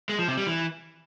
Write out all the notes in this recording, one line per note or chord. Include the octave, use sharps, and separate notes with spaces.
G#3
F3
C3
G3
E3